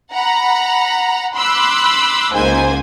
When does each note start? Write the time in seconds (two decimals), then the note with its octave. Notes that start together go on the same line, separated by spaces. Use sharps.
0.12 F#5 A#5 B5
1.36 B5 C6 D6 E6 F#6
2.33 C#2 G#2 A#3 C5 G#5